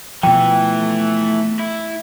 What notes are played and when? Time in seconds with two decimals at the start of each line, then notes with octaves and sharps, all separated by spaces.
0.23 B2 E3 F3 A3 E4 G5
1.59 E4